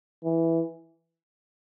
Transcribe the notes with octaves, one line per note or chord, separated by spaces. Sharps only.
E3